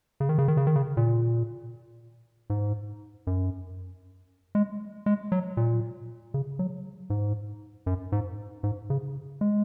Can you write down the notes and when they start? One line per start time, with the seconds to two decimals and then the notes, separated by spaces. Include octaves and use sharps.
0.20 C#3
0.29 D#3
0.38 C#3
0.48 D#3
0.57 C#3
0.67 D#3
0.76 C#3
0.97 A#2
2.50 G#2
3.27 F#2
4.55 G#3
5.06 G#3
5.32 F#3
5.57 A#2
6.34 C#3
6.59 F#3
7.10 G#2
7.86 F#2
8.12 G#2
8.63 G#2
8.90 C#3
9.41 G#3